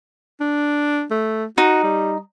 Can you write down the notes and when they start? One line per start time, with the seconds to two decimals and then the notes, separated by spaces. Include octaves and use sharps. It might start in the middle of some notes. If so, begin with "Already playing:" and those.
0.40 D4
1.11 A3
1.58 D#4 F#4
1.83 G3